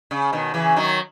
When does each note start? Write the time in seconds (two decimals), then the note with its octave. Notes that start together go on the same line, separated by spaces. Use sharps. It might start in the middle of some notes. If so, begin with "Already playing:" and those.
0.11 C#3
0.33 B2 D#3
0.54 C#3 E3
0.76 D#3 F#3